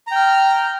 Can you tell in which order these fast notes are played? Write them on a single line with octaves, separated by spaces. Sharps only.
A#5 G5 F6